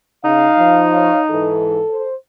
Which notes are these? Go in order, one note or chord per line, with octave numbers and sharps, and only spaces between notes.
C#3 D#4 F5
F3
C#5 F5
G#2 E3 A4
C5